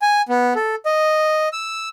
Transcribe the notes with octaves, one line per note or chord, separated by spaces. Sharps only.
G#5
B3
A4
D#5
E6